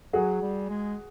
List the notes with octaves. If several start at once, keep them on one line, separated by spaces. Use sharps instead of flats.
F#3 F#4 G#4
G3
G#3